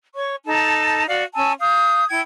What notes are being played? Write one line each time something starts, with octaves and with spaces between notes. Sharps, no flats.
C#5 C#6
D#4 A4 A5
F#4 D5 F5
C#4 G#5 A5 E6
F5 D#6 G6
E4 G5 G#6